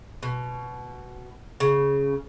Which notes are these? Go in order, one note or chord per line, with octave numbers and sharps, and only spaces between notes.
B2
C#3